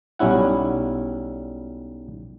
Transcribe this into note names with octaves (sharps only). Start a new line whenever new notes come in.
B1 G3 C#4 E4 F#5